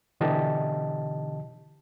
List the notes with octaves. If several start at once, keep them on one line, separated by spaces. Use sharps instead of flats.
B2 D3 E3 G4 D#5 A5